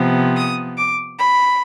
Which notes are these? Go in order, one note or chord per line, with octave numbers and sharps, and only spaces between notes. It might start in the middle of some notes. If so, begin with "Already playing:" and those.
Already playing: C3 F3 B3
D#6
D6
B5